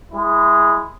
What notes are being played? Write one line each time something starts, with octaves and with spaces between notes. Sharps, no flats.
G#3 E4